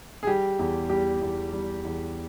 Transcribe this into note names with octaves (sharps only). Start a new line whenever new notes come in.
G#4
G3 G4
E2
G3 G4
E2
G3
E2